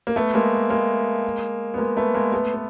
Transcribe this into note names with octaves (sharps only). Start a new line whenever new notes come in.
A#3
A3 B3
G#3 A#3
G#3 A#3
B3
G#3 A#3
A3 B3
G#3 A#3
A3 B3
B3